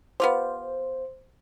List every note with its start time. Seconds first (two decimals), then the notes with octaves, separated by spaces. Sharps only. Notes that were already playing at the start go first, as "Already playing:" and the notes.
0.20 B3 F4 G4 C5